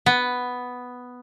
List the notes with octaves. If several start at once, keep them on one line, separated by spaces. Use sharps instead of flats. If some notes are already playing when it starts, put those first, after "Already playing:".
B3